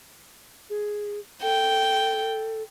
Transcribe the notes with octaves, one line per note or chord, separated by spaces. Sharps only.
G#4
A4 G5